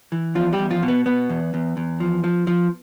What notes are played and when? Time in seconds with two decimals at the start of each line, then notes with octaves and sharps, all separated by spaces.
0.12 E3
0.35 E2 F3 F4
0.53 G3 G4
0.58 E2
0.70 F3 F4
0.83 B2
0.88 B3
1.06 B2 B3
1.29 E2
1.54 E2
1.77 E2
2.00 F3
2.24 F3
2.47 F3